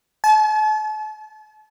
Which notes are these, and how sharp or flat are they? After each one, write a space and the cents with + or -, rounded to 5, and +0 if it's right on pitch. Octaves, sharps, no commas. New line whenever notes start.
A5 -40